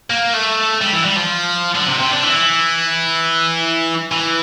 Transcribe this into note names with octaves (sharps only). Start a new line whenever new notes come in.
A#3
A3
G3
E3
G3
F3
D3
C3
C3
D3
E3
E3